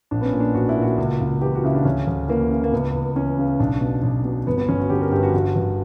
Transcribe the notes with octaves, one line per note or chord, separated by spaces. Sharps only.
A#1 D4
B3
C#4
A#2
D4
A#1 F#4
E4
A#2
F#4
C#2
C#2
E3 G4
F#4
C#3 E4
D4
D2 C#4
D2
E3 A#3
C#3
A#3
C#2 B3
C#2
E3 C#4
C#3
B1 D4
B2
B1
B2
G1 B3
B3
G1 C#4
F#4
D3 G4
A#4
G2 G4
F#4
G1 F#4
G1